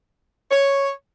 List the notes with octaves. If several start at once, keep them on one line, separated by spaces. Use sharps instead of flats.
C#5